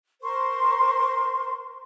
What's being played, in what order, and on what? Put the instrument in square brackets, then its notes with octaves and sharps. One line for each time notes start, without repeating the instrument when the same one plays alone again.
[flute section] A#4 C5 C6 C#6